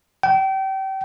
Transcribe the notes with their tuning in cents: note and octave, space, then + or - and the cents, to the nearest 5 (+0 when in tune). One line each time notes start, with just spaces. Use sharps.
G5 -30